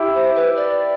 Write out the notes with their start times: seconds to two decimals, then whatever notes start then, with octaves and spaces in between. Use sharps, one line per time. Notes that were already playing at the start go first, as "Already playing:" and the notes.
Already playing: E4 G4
0.15 C5
0.35 B4
0.56 D5